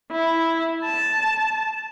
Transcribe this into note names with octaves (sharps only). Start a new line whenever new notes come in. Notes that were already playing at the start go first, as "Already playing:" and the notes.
E4
A5